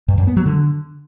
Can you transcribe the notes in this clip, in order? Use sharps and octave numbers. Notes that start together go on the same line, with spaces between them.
G2
F#2
B3
F#3
D3